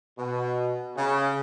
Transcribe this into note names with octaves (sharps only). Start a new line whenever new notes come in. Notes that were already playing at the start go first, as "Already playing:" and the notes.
B2
C#3